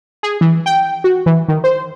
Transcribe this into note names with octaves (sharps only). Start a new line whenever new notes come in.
G#4
E3
G5
F#4
E3
D#3
C5